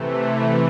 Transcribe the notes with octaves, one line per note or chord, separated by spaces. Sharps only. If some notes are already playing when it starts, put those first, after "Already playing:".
Already playing: C3 E3 A3